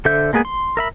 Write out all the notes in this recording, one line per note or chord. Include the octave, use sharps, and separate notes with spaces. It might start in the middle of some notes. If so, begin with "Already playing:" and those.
D3 A4 C5 E5 G6
G#3 A#3 B3 G#4 G#5
C6
A#4 E5 B5